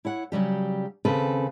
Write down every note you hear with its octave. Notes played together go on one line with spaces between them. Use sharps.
E4 C#5 F#5
C#3 F#3 G3 G4
D#2 C#3 C4 A4 B4